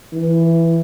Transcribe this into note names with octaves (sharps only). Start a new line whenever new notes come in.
E3